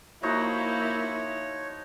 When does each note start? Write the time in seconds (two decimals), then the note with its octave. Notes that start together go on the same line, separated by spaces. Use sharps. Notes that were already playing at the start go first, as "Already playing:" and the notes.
0.23 F3 A#3 D#4 E4 F#4 C#5